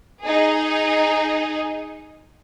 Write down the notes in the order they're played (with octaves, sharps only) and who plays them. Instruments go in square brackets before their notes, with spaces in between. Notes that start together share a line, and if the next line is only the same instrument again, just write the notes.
[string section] D#4 G#4